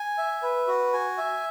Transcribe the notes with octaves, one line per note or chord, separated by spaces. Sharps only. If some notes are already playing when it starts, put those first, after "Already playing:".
Already playing: G#5
E5
B4
F#4
G#5
E5